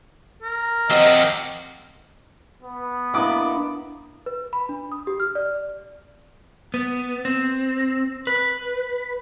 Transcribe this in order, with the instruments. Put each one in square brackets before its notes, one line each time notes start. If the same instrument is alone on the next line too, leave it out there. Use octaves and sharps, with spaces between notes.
[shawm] A#4
[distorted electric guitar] F3 F#4 [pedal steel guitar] C4 G4 E5 [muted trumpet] D#5
[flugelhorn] B3
[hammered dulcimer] A#3 E4 D#5 [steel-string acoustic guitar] D4 F#5 [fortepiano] D6 D#6
[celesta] B4
B5
D4
D#6
G4
F6
D5
[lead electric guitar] B3
C4
B4